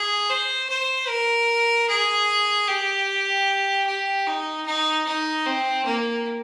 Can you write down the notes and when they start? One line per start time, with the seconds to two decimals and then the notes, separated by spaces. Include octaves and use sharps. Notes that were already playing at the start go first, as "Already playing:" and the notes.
Already playing: G#4
0.30 C5
0.69 C5
1.09 A#4
1.89 G#4
2.68 G4
3.87 G4
4.27 D#4
4.66 D#4
5.06 D#4
5.46 C4
5.85 A#3